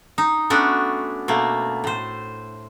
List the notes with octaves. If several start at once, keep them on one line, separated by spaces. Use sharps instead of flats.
D#4
A3 B3 C#4 D4 F#4
B2 A3 A#3
A2 C5